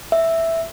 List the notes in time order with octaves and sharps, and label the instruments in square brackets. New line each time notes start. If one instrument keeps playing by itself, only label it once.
[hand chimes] E5